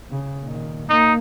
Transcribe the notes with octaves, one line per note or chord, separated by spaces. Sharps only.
C#3
A#2 D#3
A#3 D#4